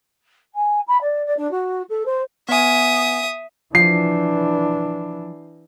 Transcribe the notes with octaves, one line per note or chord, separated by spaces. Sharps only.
G#5
B5
D5
D5
D4
F#4
A4
C5
B3 E5 G#5 D#6
E3 F3 D4 C7